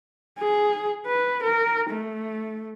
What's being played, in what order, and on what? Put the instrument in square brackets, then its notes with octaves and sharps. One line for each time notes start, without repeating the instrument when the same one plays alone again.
[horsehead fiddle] G#4
B4
A#4
A3